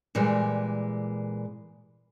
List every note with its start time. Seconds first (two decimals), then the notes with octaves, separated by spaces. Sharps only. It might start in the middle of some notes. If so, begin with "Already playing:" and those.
0.15 A#2 E3 G3 G#3